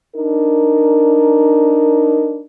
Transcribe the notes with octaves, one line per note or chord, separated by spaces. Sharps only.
D4 D#4 A#4